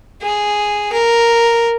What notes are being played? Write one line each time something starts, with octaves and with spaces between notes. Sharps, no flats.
G#4
A#4